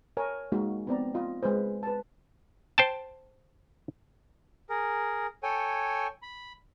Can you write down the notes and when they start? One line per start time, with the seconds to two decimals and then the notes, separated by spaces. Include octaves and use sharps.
0.17 A#4 C#5 G#5
0.52 G#3 A#3 D#4 F#4
0.87 B3 C4 D5 A#5
1.14 F4 D#5
1.43 G#3 G#4 B4 C5
1.83 B4 A5
2.78 C5 G5 A5
4.69 G#4 A#4
5.43 A4 C#5 G5 G#5
6.22 B5